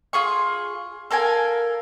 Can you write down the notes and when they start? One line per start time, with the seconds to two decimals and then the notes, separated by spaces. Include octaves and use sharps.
0.13 F4 G#4 C#6
1.11 A4 A#4 F5 G#5